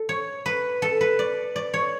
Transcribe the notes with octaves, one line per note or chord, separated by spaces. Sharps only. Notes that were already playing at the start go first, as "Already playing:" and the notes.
Already playing: A4
C#5
B4
A4
B4
D5
D5
C#5